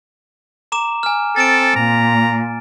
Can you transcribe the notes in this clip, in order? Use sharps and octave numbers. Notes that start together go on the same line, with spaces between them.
A#5 D6 E7
G#5 F6
C4 A4 A6 D7
A#2 A#5